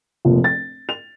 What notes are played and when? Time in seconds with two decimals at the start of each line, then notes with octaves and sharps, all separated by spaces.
0.25 F1 A#2 F3
0.44 A6
0.89 F7